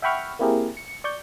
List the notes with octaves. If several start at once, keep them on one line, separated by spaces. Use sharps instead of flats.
E5 F#5 G5 B5 C#6 F6
A#3 C4 E4 G4 G#4 A#4
C#7
D5 C#6 G6